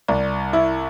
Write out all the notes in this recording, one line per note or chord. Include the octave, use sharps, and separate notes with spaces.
C2 D5
E4 E5